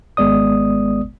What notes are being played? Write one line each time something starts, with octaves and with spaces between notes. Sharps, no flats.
G#1 G#3 B3 D5 D#6